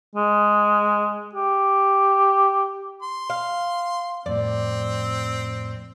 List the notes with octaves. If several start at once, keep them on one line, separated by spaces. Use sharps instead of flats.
G#3
G4
C6
F5
F2 A2 C4 D5